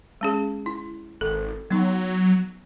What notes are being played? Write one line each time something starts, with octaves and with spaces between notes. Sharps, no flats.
G#3 C#4 G#4
E4
G#1 A4
F#3 B3 D#4